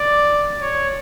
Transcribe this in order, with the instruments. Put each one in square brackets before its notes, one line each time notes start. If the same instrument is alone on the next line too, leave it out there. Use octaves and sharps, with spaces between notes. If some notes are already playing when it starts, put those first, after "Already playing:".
Already playing: [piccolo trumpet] D5
C#5